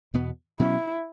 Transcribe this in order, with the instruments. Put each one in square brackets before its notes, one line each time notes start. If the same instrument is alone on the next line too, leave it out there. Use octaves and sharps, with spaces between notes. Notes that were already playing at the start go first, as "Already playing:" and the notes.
[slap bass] E2 B2 B3
[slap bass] B2 F#3 C#4 [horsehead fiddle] E4